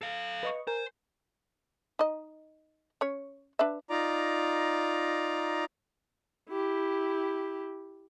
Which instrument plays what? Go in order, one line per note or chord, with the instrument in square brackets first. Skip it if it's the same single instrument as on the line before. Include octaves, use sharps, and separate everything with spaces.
[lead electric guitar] A4 F5
[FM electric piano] B4 D#5 C#6
[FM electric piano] A#4 G#5 [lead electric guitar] C5
[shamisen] D#4 D#5
C#4 C#5
D4 B4 E5
[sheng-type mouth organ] D#4 F4 D5 A#5
[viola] E4 G4